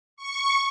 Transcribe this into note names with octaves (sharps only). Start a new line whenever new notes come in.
C#6